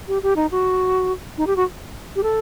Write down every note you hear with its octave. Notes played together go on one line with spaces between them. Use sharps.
G4
G4
D#4
F#4
D#4
G4
F#4
G4
A4